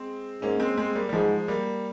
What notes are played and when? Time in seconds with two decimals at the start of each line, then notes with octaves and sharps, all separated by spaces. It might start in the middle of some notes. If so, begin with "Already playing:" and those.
Already playing: G#3 C4
0.42 G#2 A#3 C#4
0.60 G#3 C4
0.77 G#3 C4
0.95 G3 A#3
1.09 G3
1.13 G#2 F3 G#3
1.48 G3 A#3